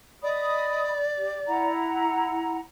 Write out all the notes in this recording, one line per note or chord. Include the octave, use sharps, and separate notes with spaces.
D5 D#5 B5 D#6
G4
E4 F#5 A#5